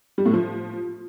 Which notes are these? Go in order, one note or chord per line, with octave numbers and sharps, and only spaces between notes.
G3
A2
F3